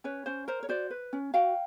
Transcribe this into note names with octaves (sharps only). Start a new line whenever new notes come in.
C#4 B4 C#5
C#4 C5
A#4 C5
C#5
F#4 C5 D5
B4
C#4
F#4 F5 G5